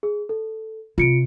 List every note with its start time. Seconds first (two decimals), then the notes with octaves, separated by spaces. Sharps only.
0.03 G#4
0.29 A4
0.98 C3 F4 C#7 D7